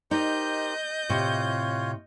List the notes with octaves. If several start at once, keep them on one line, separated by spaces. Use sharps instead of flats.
D#4 G4 A#4 C5 D#5 G6
A2 C3 C4 F4 C#5